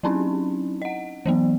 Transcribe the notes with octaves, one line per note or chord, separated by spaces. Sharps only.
F#3 C4 C#4 D#4 E4
D#5 F#5
E3 F#3 B3